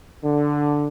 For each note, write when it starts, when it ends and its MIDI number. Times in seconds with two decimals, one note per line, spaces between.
0.23 0.87 50